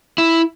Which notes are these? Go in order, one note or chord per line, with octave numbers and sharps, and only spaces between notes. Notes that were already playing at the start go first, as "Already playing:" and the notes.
E4